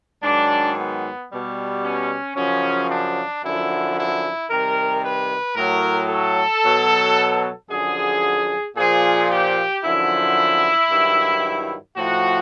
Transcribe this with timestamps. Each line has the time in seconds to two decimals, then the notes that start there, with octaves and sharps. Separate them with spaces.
0.23 G#2 D#3 F#3 D4
0.77 B3
1.31 B2 G3
1.83 C#4
2.36 F#2 C#3 F3 C#4
2.90 D4
3.44 F#2 D3 F3 E4
3.98 E4
4.50 C3 D#3 G3 A#4
5.04 B4
5.56 A2 F#3 A#4
6.10 A4
6.64 B2 F#3
7.70 F#2 D3 F3 G#4
8.77 A#2 F3 G#4
9.30 G4
9.83 F#2 D3 F3 E4
10.90 G2 D#3 F#3
11.97 A2 F3 F#4